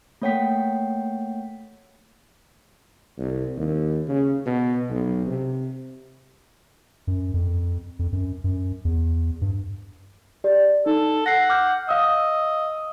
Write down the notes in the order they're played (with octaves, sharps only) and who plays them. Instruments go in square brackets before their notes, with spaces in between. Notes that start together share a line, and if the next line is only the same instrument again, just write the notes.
[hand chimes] A3 A#3 C#5 F#5 G5 B6
[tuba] C2
D#2
C#3
B2
B1
C3
[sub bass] F#2
F2
F2
F#2
F#2
E2
G2
[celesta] G4 D5
[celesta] D#4 [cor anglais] A4
[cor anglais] F#5 [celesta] A#6 C7
[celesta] D6 F6 G6
[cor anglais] D#5 [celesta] F5 E6